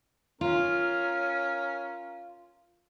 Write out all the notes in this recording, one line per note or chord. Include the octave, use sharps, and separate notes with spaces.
C#4 F4 A#4